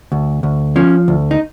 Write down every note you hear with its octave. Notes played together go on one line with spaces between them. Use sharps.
D2
D2
F3 C#4
D2
D#4